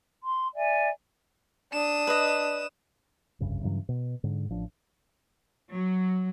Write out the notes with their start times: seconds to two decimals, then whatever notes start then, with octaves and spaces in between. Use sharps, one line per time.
0.24 C6
0.55 D5 E5 G#5
1.73 D4 D#6 E7
2.07 B4 D#5
3.40 F1 C2 G2 C#3
3.63 G2 C#3 E3 F#3
3.89 B2
4.24 G#2 D3
4.49 A1 F3 D4
5.73 F#3